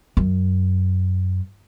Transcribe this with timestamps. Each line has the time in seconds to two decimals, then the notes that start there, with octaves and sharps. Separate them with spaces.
0.17 F#2